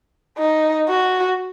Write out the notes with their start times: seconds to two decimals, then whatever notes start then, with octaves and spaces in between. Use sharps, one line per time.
0.39 D#4
0.89 F#4